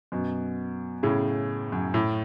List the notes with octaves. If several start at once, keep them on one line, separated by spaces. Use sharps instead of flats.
F#2 B2
A2 C#3
F#2
A2